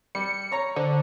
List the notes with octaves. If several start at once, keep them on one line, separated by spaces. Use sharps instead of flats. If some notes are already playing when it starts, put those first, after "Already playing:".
G3 C#7
C#5 A#5
D3 C5